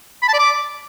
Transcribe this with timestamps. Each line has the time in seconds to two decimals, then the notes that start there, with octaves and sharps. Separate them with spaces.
0.23 B5
0.28 A5
0.34 D5
0.39 D6